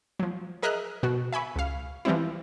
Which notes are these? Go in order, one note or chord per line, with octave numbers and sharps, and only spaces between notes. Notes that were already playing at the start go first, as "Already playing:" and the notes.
F3 F#3
G#4 A#4 D#5 E5 F6 F#6
B2 F#4
E5 G#5 B5 C#6
C#2 F5
E3 F3 G3 C4 E4